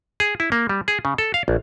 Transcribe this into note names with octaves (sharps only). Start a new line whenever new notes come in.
G#4
E4
A#3
G3
G#4
C#3
A4
F5
A#1